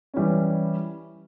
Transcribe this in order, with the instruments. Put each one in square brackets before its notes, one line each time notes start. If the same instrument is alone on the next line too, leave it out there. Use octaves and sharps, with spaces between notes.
[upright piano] E3 G3 C#4